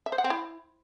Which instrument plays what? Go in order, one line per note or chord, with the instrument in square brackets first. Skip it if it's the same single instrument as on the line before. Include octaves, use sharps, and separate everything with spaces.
[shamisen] E5
C5
F#5
C4
E4